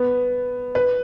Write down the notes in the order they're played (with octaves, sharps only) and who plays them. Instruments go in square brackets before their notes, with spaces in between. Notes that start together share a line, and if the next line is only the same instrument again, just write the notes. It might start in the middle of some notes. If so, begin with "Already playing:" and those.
Already playing: [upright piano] B3
B4